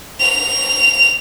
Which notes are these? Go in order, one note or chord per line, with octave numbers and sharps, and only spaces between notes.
F7